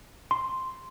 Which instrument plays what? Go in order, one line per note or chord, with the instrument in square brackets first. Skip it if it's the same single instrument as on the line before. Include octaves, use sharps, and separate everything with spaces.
[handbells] C6